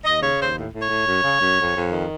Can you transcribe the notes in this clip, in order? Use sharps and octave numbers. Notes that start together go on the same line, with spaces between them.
D#2 D#5
C#3 C#5
D#2 C5
A2
A2
C#5
A2
F#2
C#3
F#2
F2
F2
D#3